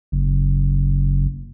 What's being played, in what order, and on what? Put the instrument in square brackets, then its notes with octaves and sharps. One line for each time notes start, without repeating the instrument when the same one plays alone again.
[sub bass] F#1